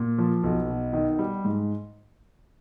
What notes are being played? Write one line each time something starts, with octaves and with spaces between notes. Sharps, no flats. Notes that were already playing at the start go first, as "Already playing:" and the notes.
Already playing: A#2
F3
B1
B2
D#3
G3
G#2